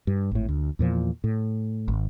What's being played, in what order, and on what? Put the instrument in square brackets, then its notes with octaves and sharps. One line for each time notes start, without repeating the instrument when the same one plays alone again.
[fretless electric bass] G2
G#1 A2
D2
E2 A#2 F3
A2
G#1